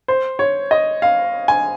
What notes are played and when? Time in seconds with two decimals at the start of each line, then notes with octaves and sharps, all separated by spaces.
0.08 C5
0.39 C#5
0.71 D#5
1.02 F5
1.48 G#5